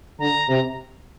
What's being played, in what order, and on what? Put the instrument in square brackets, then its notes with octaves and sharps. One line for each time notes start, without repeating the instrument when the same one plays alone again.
[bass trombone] D3 [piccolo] A#5
[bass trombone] C3